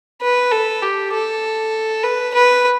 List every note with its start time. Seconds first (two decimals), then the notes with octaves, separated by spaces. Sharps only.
0.22 B4
0.52 A4
0.82 G4
1.13 A4
2.04 B4
2.34 B4